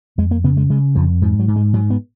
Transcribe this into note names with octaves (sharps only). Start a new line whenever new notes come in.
F2 G#3
A#3
C#3 B3
G#3
C#3 G#3
F2 F3
G#2 F3
F#3
G#2
G#3
G#2 F#3
B3